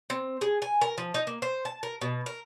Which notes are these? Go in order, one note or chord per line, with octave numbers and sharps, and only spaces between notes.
C4
G#4
G#5
A#4
F3
D#4
A#3
C5
A5
A#4
B2
A#4